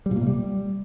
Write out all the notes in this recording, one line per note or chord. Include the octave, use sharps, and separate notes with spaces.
G3
A#2
A#3
C3
G3